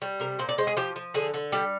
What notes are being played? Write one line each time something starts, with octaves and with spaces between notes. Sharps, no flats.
G3
C3 A#4
A#2 C5
D5
G#3 C5
G#4
F3 G4
F3
D3 G#4
D3
G3 G4